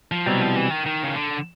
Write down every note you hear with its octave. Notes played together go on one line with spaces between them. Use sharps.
F3
C2 B2 F#3 G3 C4 E4
F3
E3
D#3
D#3
C#3
D3